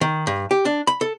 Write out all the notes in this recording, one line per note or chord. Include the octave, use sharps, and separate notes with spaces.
D#3
G2
G4
D4
B5
A4